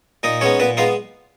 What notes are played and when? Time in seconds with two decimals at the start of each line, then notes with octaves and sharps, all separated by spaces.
0.23 A#2 D#4 D#5
0.41 G#3 B3 C#4 D#4 C#5
0.60 A#2 B3 B4
0.77 G#3 B3 D#4 F4 F5